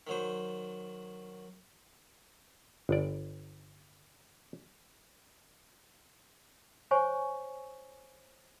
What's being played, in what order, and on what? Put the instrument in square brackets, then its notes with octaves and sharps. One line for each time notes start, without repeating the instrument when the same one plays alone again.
[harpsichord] D#3 F#3 C5
[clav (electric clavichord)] G1 D5
[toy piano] C5 C#5 G#5 C#6